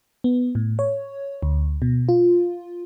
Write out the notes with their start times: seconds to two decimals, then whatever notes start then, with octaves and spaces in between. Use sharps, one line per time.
0.24 B3
0.55 A2
0.79 C#5
1.43 D2
1.82 B2
2.09 F4